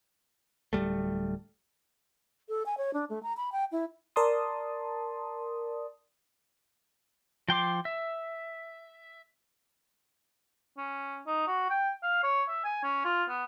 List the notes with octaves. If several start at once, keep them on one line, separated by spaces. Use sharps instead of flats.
D1 G#2 G3 A3
A4
G#5
C#5
D4
A3
A#5
B5
G5
E4
A#4 D5 A5 C6 D#6
F3 G5 C6 D6
E5
C#4
D#4
F#4
G5
F5
C#5
E5
G#5
C#4
F4
B3